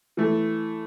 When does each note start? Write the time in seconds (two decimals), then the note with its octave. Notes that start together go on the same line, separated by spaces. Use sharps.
0.17 E3 A3